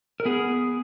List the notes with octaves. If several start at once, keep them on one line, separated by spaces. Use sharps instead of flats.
A#4
B3 G#4